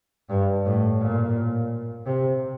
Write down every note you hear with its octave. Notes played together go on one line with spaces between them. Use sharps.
G2
A2
A#2
C3